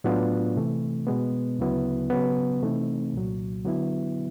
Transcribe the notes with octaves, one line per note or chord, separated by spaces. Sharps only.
A2 F#3 B3 D4 F4
C3 E3 A3
B2 G#3 B3
D2 C#3 F#3 B3 E4
C#3 F#3 B3
C3 E3 A3 C4 D#4
C2 A#2 F#3
D3 F#3 B3 E4